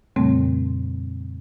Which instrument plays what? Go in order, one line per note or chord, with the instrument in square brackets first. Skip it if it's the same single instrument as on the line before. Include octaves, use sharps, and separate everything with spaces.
[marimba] F2 A#2 C#3 G3 A3 C4